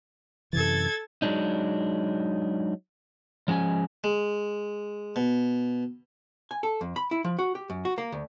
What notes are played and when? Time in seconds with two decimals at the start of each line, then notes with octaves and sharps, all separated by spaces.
0.53 F#2 C3 E3 A4 G#6 A6
1.22 F#3 G#3 D4 D#4
3.48 F3 G#3 C#4 G#5
4.04 G#3
5.16 B2
6.51 G#5
6.63 A4
6.81 F2
6.96 B5
7.11 E4
7.24 F3
7.39 F#4
7.55 G4
7.70 F#2
7.85 F#4
7.98 A#3
8.12 D2